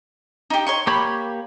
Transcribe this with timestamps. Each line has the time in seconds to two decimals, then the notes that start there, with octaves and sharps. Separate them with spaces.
0.50 D#4 G4
0.67 C#5 C6 C#6
0.87 A#3 G4 C#5 B5